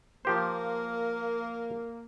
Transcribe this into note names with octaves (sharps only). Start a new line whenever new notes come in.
F3 A#3 G4 A#4 C5